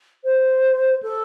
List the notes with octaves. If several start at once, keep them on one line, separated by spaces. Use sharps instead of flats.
C5
A4